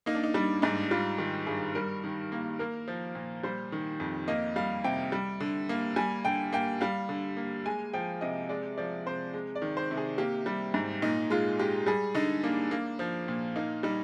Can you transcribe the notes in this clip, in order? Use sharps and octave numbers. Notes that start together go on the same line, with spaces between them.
A#3 D#4
D4
D#4
G3 D4
G#2 D#4
G3 F4
D#3 G4
G2 G#4
G3 A#4
D#3
A#3
A#3 A#4
F3
A#2
G3 C5
D#3
F2
A#3 D#5
G3 F5
C3 G5
G3
D3
A#3
G3 G#5
D3 G5
A#3 G5
G3 F5
D3
A#3
G#3 G#5
F3 G5
C3 D#5
G#3 D5
F3 D5
C3 C5
G#3
D5
D#3
C5
C3
G#4
A#3 G4
G3
G#2
A#2 D#4
G#3 F4
G#3 G4
G3 G#4
D3 D#4
A#3 D4
A#3
F3
A#2
A#3 D#4
G3 D#4